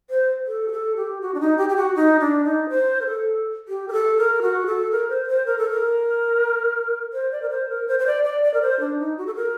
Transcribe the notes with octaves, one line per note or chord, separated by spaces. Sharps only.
C5
A4
G4
A4
G4
F#4
D4
D#4
G4
G4
F#4
D#4
D4
D#4
C5
A#4
A4
G4
A#4
A4
A#4
F#4
A4
A#4
C5
A#4
C5
A#4
A4
A#4
C5
D5
A#4
C5
A#4
C5
C5
D5
D5
D5
A#4
C5
D4
D#4
F#4
A4
A#4